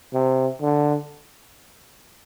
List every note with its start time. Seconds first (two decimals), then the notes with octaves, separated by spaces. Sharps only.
0.14 C3
0.62 D3